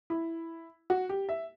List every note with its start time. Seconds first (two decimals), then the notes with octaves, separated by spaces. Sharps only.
0.10 E4
0.90 F#4
1.09 G4
1.29 E5